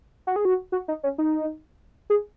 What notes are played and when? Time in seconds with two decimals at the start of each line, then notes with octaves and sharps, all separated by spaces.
0.27 F#4
0.36 G#4
0.45 F#4
0.72 F#4
0.88 D#4
1.03 C#4
1.18 D#4
2.10 G#4